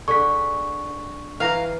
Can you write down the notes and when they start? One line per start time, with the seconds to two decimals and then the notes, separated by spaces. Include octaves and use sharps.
0.08 D3 G#4 C#6 B6
1.40 E3 F5 A#5